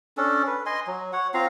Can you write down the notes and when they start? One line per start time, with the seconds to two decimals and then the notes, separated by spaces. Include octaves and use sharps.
0.17 C#4 D4 A4
0.47 B4
0.66 D#5 G#5 C6
0.87 F#3
1.13 C#5 F#5
1.34 C4 F4 F5 A#5